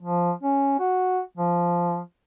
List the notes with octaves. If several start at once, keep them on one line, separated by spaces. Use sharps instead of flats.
F3
C#4
F#4
F3